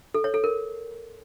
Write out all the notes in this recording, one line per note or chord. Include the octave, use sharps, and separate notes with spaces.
A4
C#5
A4
A#4